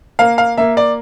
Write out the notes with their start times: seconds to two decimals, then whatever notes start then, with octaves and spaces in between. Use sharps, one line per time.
0.19 A#3 F5
0.38 F5
0.58 A#3 E5
0.77 D5